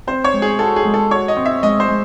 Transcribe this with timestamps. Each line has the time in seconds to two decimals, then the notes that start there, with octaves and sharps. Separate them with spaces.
0.07 C4 C5
0.24 C#5
0.34 G#3
0.42 G#4
0.59 F#4 A4
0.76 G#4
0.85 G#3
0.94 A4
1.11 F#4 C#5
1.28 D#5
1.37 C4
1.46 E5
1.63 G#3 D#5
1.80 C5
1.88 G#3